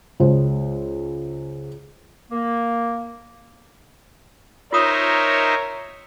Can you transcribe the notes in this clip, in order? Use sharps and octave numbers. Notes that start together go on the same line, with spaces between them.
C#2 C5
A#3
D#4 F4 A#4 C5 C#5 E5 D#6